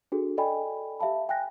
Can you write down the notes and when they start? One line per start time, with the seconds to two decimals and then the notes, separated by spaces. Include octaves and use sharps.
0.12 D4 F#4 G#4 A4
0.37 A4 D5 D#5 G5 G#5 B5
0.99 G4 E5 F5 A5 B5
1.29 G5 G#5 F#6 A#6